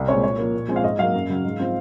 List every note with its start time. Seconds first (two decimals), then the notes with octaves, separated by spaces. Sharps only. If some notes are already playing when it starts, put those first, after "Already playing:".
Already playing: C2
0.08 A#2 G#3 C4 C#5
0.24 A#2 C#5
0.38 F3 A#3
0.54 A#2
0.68 F3 G#3 C4
0.76 F5
0.84 G#2 D#5
0.99 F#3 A#3 F5
1.14 F#2
1.29 C#3 F#3
1.44 G#2
1.60 F3 C4